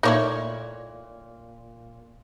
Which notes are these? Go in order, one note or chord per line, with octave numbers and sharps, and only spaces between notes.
A#2 A3 A#3 D#4 E4 A#4 C#5